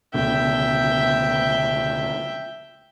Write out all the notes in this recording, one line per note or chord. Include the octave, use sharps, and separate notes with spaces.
C#2 B2 D3 E5 G5